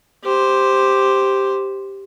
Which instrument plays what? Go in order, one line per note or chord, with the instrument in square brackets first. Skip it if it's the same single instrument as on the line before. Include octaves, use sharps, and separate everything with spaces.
[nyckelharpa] G4 C5